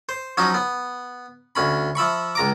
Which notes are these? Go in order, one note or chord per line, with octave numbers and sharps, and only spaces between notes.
C5
F3 F#3 C#4 D#4
B3
D2 C#4 B5
F3 E5 B5 C#6
C#2 A#5 D6